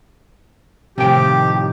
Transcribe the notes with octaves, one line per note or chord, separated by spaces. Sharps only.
A2 C3 D#3 F3 G4 G5